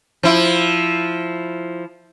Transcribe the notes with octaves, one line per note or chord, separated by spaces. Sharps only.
F3 E4